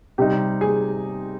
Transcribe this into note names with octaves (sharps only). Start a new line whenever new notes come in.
C3 G3 C4 D#4 G4
G#4